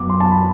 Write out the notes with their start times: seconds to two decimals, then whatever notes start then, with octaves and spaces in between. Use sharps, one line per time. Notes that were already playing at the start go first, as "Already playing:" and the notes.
Already playing: F#2 F#3 B3 D6
0.10 C6
0.20 A5
0.31 B5